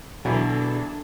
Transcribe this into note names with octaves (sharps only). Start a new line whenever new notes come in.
B2 D3 E3 F#3 D4 G#4 A4